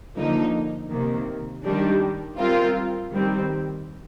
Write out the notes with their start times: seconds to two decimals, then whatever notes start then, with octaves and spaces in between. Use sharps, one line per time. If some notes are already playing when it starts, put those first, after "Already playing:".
0.17 D3 F3 A#3 D#4
0.91 C3 D#3 A#3
1.64 D#3 G3 D4
2.38 G3 C4 F4 A#4
3.12 D#3 G3 C4